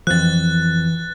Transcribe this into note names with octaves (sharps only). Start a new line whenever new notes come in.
F2 E3 F3 F#6 A6